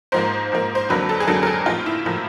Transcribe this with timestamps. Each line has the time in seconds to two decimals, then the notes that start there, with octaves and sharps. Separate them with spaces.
0.12 G#2 F3 A#3 C5
0.52 G#2 F3 A#3
0.75 C5
0.89 F2 D3 F#3 A#3 B4
1.09 A4
1.20 G#4
1.27 F2 D3 F#3 A#3 A4
1.43 A#4
1.47 A4
1.66 A2 F3 A#3 F4
1.86 E4
2.05 A2 F3 A#3